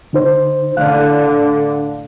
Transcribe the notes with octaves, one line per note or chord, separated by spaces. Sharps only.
D3 D#4 C5
A2 D3 F5 F#6